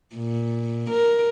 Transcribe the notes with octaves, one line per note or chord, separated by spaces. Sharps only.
A#2
A#4